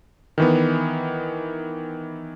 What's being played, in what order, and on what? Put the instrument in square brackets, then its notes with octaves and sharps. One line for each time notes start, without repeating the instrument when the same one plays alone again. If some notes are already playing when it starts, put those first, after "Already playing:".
[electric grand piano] D#3 E3 B3